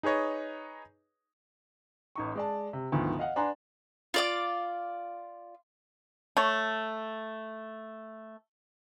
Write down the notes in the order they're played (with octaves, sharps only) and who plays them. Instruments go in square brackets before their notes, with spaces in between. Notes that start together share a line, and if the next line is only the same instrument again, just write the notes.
[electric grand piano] D#4 G#4 B4 C#5 D#5
[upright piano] A1 D#4 C#6
G#3 D5 A5
C3
D2 G#2 D#3 F3 B3
D#5 F5 F#5
D4 B4 F#5 G#5 A#5 C6
[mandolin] F4 D5 D6
[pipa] A3 C#5